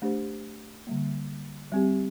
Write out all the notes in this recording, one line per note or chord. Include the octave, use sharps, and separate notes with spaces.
A3 D4 G4 C5
D3 G3 A#3
G3 C4 G4